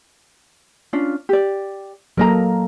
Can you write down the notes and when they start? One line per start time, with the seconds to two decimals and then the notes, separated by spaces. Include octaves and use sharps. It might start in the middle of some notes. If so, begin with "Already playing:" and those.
0.93 C#4 D4 F4
1.29 G4 D5
2.17 F#3 A#3 A4 A#4 D#5 A#5